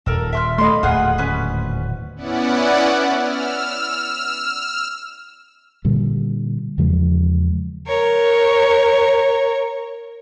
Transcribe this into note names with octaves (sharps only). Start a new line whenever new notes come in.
D#1 A4 A#4
E5 C6 F6
A3 D#5 F5 B5 C6
D1 D#2 A#2 F4 G#4 F#5
B3 C#4 B4
B3 C#4 E4 D5 F#5
E6 F6
A#2 D3 G3
E2 C#3 F3 G#3
A#4 C#5